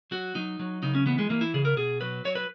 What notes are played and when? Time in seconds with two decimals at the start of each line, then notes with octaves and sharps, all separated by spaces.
0.11 F#3 F#4
0.35 F#3 D#4
0.59 F#3
0.83 C#3 D#4
0.95 C#4
1.06 E3 B3
1.19 G#3
1.30 E3 A#3
1.41 E4
1.54 C#3 G#4
1.65 A#4
1.77 B2 G#4
2.01 F#3 B4
2.25 F#3 C#5
2.35 B4